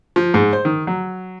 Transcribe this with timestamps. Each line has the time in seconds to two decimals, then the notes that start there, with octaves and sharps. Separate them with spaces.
0.16 F3
0.34 G#2
0.53 C5
0.65 D#3
0.87 F#3